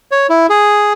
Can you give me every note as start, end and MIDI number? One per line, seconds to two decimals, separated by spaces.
0.11 0.27 73
0.29 0.47 64
0.50 0.93 68